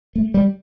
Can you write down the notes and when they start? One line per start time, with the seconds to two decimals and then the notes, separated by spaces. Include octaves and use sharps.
0.15 A3
0.34 G3